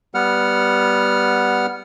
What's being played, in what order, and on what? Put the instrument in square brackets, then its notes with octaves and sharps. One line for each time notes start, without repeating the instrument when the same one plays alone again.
[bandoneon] G3 B3 F#5 F6